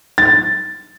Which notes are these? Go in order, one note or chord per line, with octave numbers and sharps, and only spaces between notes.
A6